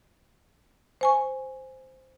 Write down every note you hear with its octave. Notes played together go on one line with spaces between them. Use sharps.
C5 G#5 C#6